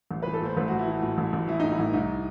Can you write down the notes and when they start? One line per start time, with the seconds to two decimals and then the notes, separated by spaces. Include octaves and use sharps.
0.11 A1
0.22 B4
0.26 E3
0.34 A4
0.41 A2 C5
0.57 A1 B4
0.68 F#4
0.72 A1
0.79 E4
0.87 E3 F#4
1.02 A2
1.18 A1
1.33 A1
1.47 E3 E4
1.60 A2 D#4
1.71 E4
1.79 A1
1.93 C2 D#4